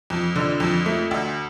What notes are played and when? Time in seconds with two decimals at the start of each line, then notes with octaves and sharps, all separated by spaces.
0.10 F2
0.36 D3
0.60 F2
0.86 A3
1.11 D2